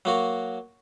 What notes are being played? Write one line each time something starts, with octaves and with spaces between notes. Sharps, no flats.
F#3 A#3 F#4